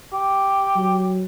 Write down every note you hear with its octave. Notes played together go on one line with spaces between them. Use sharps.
G4
F#3